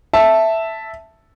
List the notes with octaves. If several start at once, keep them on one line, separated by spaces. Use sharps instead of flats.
E5 A5